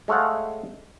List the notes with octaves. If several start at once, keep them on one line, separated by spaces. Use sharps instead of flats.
G#3 A3 C#5 F5 F#5